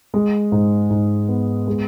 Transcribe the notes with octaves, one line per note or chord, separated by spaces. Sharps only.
G#3
G#2
G#2
B3
G#3